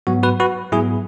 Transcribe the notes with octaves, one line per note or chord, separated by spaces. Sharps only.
G#2 F#3 B3 F#4
F#4 B4
F#4 B4
G#2 F#3 B3 E4 G#4